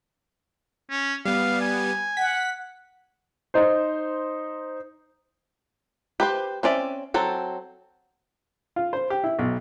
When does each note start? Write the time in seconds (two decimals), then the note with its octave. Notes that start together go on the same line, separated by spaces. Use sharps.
0.91 C#4
1.25 G3 B3 F5
1.61 G#5
2.17 F#5 B6
3.54 D#4 C5
6.20 G4 B4 C5
6.63 C4 C#4 D5 E5
7.14 F#3 C4 A4
8.76 F4
8.93 C5
9.10 G4
9.24 E4
9.39 B1